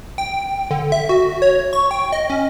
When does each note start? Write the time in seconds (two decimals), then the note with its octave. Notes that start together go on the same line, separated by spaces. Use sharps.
0.18 G5
0.71 D3
0.92 E5
1.09 F#4
1.42 C#5
1.73 C#6
1.91 G5
2.13 D#5
2.30 C#4